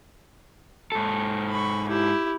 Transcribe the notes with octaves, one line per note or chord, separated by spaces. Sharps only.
G#2 A4
B5 C#6
E4 G4